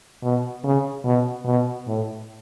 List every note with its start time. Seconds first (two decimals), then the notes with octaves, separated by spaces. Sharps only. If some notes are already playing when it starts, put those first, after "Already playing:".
0.23 B2
0.64 C#3
1.04 B2
1.45 B2
1.87 A2